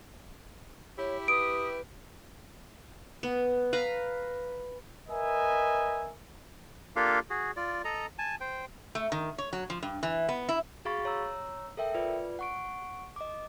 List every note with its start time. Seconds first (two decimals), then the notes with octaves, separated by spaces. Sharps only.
0.98 E4 G4 C#5
1.28 B4 D#6 D7
3.23 B3
3.73 B4 F5 A#5
5.10 A#4 B4 D#5 E5 G#5
6.96 A#3 D4 F4 G4 A4 F5
7.30 F#4 G#4
7.57 F4 D5
7.85 A4 D#5 A#5
8.18 G#5 A5
8.41 C5 G5
8.95 A3
9.12 D#3
9.38 C#5
9.53 F#3
9.70 F3
9.83 G2
10.03 E3
10.29 B3
10.49 E4
10.85 F#4 G#4 F5 B5 C#6 A6
11.05 C#5 A#5 E6
11.77 A4 A#4 E5 G5
11.95 F4 B4 D5
12.39 F#5 C#6 D7
13.16 D#5 D6